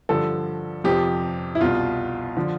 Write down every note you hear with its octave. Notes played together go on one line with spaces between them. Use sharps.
G2 D3 F3 A4
F2 C3 F3 G4
E4
C2 B2 F4
D3 F3